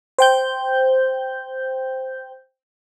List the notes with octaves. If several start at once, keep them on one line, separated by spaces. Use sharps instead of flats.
C5 G5 G6